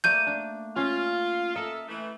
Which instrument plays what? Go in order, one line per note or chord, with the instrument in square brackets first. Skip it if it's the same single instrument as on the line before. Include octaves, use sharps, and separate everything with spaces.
[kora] A3 A#3 D5 [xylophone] G6 D#7
[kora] D4
[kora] C#4 [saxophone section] F4
[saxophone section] A4 [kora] A#4 D#5 E5
[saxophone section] E3 A3